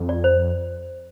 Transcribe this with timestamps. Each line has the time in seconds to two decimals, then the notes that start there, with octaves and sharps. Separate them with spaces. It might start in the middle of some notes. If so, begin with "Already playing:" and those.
Already playing: F2
0.09 D5
0.24 C5